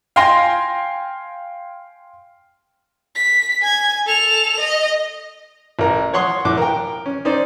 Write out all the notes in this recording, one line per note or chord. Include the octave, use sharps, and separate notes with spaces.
F5 G5 G#5 C6 A#6
B6
G#5 G#6
A4 F7
D#5
A1 A#4
C#5 F#5 C6 C#6 D#6
A2 D6 F#6
A#4 G5
C#4
C#4 D#4 C5 D5